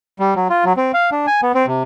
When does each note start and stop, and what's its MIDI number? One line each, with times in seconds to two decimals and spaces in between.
0.19 0.34 55
0.36 0.48 54
0.50 0.64 65
0.65 0.73 54
0.77 0.92 60
0.94 1.10 77
1.11 1.26 62
1.27 1.41 80
1.42 1.52 59
1.55 1.66 60
1.67 1.83 48